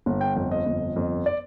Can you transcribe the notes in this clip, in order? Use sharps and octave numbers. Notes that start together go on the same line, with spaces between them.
G1
G5
F2 G5
D#5
G1
F2
D5